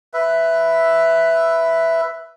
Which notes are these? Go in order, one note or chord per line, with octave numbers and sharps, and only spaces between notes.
B4 E5